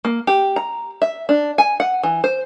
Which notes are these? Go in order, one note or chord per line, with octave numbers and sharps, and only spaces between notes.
A#3
G4
A#5
E5
D4
G#5
F#5
E3
C5